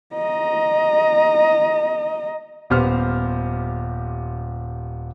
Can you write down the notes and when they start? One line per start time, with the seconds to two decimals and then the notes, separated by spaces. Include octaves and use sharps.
0.14 D#5 A#5
2.70 D#1 B3 G4 C5 F6